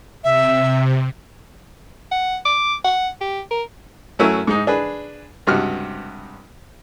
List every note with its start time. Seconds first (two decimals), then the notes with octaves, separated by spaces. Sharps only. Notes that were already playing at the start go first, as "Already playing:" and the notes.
0.24 C3 E5
2.12 F#5
2.45 D6
2.84 F#5
3.21 G4
3.51 A#4
4.19 F#2 F#3 A3 C#4 E4
4.47 G#2 G#3 D#4
4.67 D4 G#4 B4
5.47 C#2 G2 C3 F#4 F6